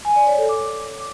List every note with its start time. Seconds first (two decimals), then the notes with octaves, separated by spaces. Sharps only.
0.05 G#5
0.16 D5
0.27 C#5
0.38 A4
0.49 D6